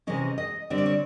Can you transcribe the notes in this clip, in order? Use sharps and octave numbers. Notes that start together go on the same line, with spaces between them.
C3 E3 G#3 C#4 D#5
D#5
D3 G3 C4 D#5
D5
C#5